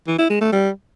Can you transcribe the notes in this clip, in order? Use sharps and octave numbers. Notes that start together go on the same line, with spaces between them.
E3
E4
G#3
A3
G3